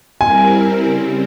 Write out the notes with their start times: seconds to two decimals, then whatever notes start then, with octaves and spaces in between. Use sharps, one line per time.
0.21 G3 C4 E4 A#4 G#5
0.84 C#3 G3 C4